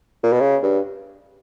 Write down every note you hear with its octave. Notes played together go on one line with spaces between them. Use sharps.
A#2
B2
C#3
G2